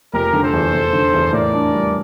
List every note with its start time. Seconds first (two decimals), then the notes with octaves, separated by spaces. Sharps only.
0.13 F1 G4 A#4
0.33 D3
0.43 A4 C5
0.53 E2
0.73 F1
0.93 D3
1.14 E2
1.32 A2 A#4 D5
1.53 D4
1.73 G3